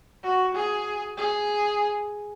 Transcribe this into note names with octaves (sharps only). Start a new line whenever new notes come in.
F#4
G#4
G#4